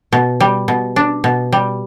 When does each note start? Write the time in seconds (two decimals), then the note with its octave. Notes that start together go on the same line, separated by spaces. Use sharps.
0.12 B2
0.40 G3
0.68 B2
0.96 D4
1.24 B2
1.52 G3